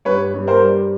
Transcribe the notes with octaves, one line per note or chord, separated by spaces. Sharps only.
G2 B4 C#5
G2
A#4 C5
G3